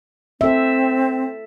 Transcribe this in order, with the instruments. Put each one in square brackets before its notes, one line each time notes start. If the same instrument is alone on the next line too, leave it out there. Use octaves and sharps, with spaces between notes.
[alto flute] C4 [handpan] A4 E5